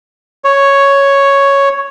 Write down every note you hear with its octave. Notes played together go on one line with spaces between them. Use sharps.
C#5